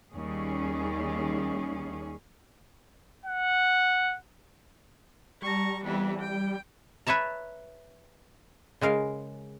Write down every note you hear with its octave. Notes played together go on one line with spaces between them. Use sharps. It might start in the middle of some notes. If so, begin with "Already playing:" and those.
D#2 G3 C#4 G#4
F#5
G3 A5 A#5 C#6
F2 E3 B3
G5
B4 C#5 E5 A5 A#5
C#3 G#3 A#4 F5